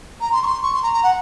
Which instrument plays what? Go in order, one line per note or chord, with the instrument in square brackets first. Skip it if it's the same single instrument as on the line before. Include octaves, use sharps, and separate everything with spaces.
[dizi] A#5
C6
C#6
C6
C#6
C6
A#5
A#5
F#5